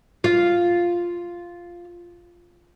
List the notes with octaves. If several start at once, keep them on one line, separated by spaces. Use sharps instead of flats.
F4 F5